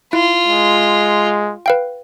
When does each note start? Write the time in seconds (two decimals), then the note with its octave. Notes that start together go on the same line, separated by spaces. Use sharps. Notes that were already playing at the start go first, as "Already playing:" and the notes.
0.13 E4 F4
0.46 G#3
1.66 B4 F5 G5